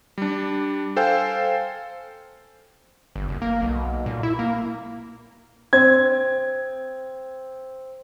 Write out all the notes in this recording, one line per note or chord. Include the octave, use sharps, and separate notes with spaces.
G3 D4
A4 C5 F5 G5 G#5
G1
F#1
A#3
B1
A#2
E4
A#3
C4 G#6